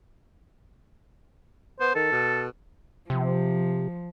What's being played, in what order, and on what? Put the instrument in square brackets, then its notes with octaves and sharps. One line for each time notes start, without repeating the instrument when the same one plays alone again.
[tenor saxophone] B3 [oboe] C5
[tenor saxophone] D#3 [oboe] A4
[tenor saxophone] B2
[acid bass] C3 [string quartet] F3